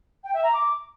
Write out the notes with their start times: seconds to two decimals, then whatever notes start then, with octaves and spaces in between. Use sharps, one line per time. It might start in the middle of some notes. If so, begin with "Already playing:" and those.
0.24 G5
0.34 E5
0.44 A#5
0.53 D6